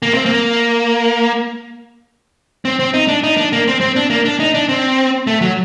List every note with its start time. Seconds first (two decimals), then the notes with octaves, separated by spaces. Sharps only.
0.02 A#3
0.14 C4
0.25 A#3
2.65 C4
2.79 C4
2.94 D#4
3.08 D4
3.23 D#4
3.37 D4
3.53 A#3
3.67 C4
3.81 C4
3.96 D4
4.10 A#3
4.25 D4
4.40 D#4
4.54 D4
4.69 C4
5.27 A3
5.42 F#3